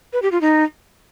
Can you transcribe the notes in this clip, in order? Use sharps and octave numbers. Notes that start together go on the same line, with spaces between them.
B4
G4
F4
D#4